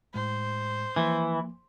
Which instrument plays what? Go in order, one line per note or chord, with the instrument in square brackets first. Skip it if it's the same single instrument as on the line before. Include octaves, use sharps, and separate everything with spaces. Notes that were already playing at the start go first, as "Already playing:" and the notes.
[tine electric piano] A2 G#3 [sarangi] C5
[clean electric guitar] E3 [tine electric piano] F3 A#3